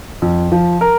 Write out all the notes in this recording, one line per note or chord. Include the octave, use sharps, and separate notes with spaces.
F2
F3
A#4